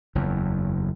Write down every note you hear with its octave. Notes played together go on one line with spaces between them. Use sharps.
F#1 E2